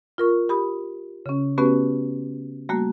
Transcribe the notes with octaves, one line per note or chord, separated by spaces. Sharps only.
F4 A#4 C#6
G4 B5 D#6
C#3 C#4
A3 B3 C#4 F#4 G4 B4
G3 A3 A#3 F#4